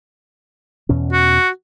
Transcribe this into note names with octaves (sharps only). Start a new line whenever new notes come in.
E2 B2 C#4
F#4